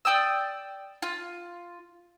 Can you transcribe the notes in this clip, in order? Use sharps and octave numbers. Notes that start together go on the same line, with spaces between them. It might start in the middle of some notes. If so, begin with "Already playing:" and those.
D5 G5 D#6 E6
F4